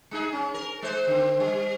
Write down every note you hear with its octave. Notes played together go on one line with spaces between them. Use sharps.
G#3 D#4 G#4
C#4
A#4
G#3 C5
D3 C4
G3